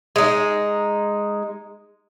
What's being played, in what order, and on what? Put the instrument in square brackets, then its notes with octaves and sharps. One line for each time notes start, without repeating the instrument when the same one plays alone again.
[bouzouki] G#3 D#4